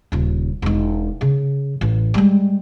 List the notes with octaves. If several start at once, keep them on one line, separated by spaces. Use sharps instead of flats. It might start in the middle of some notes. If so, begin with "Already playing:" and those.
D#1 C#3
E1 D#4
C#3
A1
G3 G#3